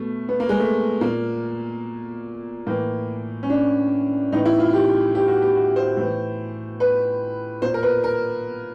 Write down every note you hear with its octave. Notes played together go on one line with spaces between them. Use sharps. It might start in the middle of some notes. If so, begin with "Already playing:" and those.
Already playing: B2 A3
B3
A#3
G#3
A3
A#2 A#3
A2 E3 A#3
C#4
D4
A2 E3 D#4
E4
F4
G4
G4
F#4
G4
F#4
C5
A2 E3
B4
A#2 C5
A#4
B4
A#4